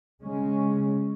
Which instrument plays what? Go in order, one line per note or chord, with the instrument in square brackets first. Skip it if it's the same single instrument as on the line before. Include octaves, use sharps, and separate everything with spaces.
[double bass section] C#3 G#3 C#4